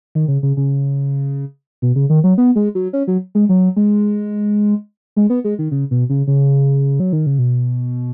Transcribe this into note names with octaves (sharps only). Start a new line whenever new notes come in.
D#3
C#3
C#3
C#3
B2
C#3
D#3
F#3
B3
G#3
F#3
C#4
F#3
G#3
F#3
G#3
G#3
B3
G#3
D#3
C#3
B2
C#3
C#3
F#3
D#3
C#3
B2